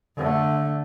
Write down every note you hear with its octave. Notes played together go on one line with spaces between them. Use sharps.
D3 A3